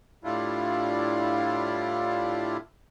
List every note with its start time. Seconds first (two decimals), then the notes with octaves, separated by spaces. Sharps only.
0.24 A2 G3 D4 E4 F4